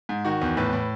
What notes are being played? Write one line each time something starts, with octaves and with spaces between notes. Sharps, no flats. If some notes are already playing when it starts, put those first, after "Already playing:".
G#2
D#3 F#4
E2
A2 B4
A2